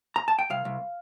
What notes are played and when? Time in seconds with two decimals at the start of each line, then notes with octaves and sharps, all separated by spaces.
0.16 A#5
0.28 A5
0.39 G5
0.50 C2 F5
0.65 C2